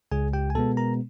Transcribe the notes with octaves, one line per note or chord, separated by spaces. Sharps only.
C#2 G#4 G#5
G4 G5
G#5
B2 G#3 B3 A4 A5
A#4 A#5